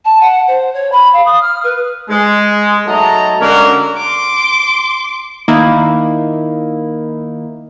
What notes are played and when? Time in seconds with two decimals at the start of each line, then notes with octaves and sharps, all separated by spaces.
0.05 A5
0.20 F#5
0.47 C5
0.74 C#5
0.92 B5
1.13 F5
1.25 D#6
1.41 F6
1.63 B4
2.09 G#3
2.87 F#3 A3 D#4 D#5 A5 A#5
3.41 D3 G#3 A#3 C#4 F#4 A#4
3.98 C6 D6
5.48 D#3 A#3 D#4 E4